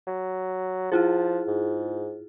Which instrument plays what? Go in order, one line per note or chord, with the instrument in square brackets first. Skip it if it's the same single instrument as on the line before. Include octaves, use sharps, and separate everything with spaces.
[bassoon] F#3
[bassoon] F3 [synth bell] E4 F4 G#4
[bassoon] G#2